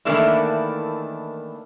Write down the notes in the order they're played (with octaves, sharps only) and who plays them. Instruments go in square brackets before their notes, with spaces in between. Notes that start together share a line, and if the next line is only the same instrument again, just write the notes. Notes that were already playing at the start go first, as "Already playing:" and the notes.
[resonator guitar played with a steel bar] D#3 E3 A3 A#3 D4 E4